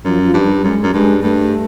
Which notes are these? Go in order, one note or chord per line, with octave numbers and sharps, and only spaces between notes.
F#2 F3
F3
G2
G3
F#2 G#3
F#2
G2 G#3
G2 A3